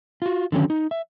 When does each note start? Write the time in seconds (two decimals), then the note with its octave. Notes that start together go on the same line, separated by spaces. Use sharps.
0.22 F4 F#4
0.52 D3 D#3 F#3 C#4
0.70 D#4
0.91 E5